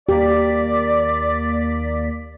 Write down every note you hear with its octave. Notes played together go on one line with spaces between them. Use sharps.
D#2 A#3 G4 D5 B6